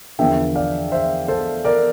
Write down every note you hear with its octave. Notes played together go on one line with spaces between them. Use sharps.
E2 D3 F3 A#3 E5 G5
D5 F5
C5 E5
A4 C5
A#4 D5